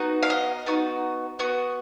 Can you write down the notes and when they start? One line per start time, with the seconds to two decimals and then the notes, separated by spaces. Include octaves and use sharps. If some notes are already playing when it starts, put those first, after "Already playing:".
Already playing: B3 D#4 F#4
0.22 F5
0.30 D#5
0.66 B3 D#4 F#4
1.39 B3 F#4